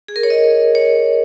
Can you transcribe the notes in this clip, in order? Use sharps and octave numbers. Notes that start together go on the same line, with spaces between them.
G#4
A#4
C#5
D#5
C#5